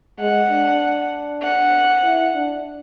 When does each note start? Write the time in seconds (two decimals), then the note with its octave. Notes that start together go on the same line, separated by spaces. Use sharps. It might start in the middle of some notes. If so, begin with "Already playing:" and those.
0.19 G#3 F#5
0.50 D4
1.42 F#5
2.03 E4
2.34 D4